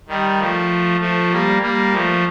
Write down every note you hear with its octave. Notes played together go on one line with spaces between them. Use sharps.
D#3 G3
F3 A3
F3 A3
G3 A#3
G3 A#3
F3 A3